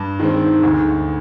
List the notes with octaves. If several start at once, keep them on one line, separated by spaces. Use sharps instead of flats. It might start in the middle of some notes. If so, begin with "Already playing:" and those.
Already playing: G2
D#3 G#3 C4
D2